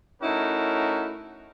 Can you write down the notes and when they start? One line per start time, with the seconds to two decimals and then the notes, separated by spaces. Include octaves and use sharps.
0.22 A3 C#4 D#4 E4 F#4 A#4